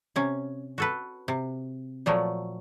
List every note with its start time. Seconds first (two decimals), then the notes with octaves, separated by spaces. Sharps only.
0.16 C3 C#4
0.78 F#4 A4 B4
1.28 C3
2.06 A#2 F3 F#3 A3